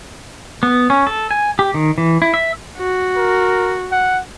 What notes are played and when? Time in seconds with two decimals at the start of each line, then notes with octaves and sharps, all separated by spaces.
0.63 B3
0.90 C#4
1.07 A4
1.31 G#5
1.59 G4
1.74 D#3
1.98 E3
2.22 E4
2.34 E5
2.78 F#4
3.17 A#4
3.91 F#5